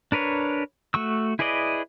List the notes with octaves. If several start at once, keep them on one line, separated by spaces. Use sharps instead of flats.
D4 A#4 B4 C#5
A3 F#4 C#6 E6
E4 G#4 B4 D5 D#5